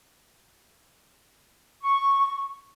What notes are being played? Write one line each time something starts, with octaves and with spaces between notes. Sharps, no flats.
C#6